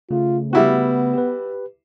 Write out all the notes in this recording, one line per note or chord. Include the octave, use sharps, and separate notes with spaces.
C#3 A3 F4
G3 B3 E4 F#4
G4 B4